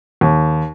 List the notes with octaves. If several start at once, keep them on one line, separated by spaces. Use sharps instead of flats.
D#2